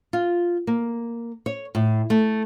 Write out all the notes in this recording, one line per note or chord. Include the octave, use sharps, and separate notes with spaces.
F4
A#3
C#5
A2
A3